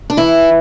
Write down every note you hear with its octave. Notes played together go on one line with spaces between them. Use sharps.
D4
E3 E4